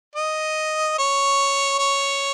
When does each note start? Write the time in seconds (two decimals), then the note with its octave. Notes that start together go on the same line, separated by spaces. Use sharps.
0.16 D#5
0.98 C#5
1.79 C#5